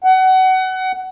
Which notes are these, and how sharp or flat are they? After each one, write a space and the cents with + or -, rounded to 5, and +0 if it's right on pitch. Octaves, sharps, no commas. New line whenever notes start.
F#5 +25